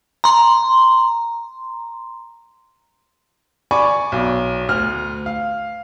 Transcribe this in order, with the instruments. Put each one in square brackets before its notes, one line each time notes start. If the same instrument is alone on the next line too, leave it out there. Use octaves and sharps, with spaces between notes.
[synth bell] A#5 C6
[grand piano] D5 G#5 B5 C#6 D6
B1
D2 F6
F5